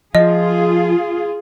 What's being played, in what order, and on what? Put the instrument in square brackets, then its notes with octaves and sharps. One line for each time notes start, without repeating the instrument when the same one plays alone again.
[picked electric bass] F3 [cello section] F4 G#4 [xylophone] D#5